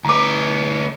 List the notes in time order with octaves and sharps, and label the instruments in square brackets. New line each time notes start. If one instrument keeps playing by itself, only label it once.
[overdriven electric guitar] D2 B4 [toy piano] A#5 D6